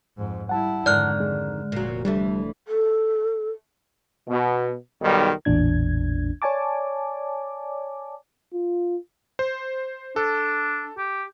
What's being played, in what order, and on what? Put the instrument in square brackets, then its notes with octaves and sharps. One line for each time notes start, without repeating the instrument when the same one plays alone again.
[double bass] F2 G#2
[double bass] G3 E4 [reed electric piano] F#5 A5
[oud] F2 G#2 D#3 [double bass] D3 [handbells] D5 F6 F#6
[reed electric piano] G#3
[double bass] F1 [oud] A#2 F#3
[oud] D2 E3 A3 [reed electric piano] G3
[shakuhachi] A4
[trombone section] B2
B1 D#3 G3
[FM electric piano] A1 E2 A#2 D4 G#6
C#5 D5 G#5 A5 D6
[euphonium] F4
[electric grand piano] C5
[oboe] D4 [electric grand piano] A4
[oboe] G4